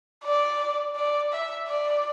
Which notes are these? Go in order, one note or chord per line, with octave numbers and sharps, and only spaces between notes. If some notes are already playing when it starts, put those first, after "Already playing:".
D5
D5
E5
D5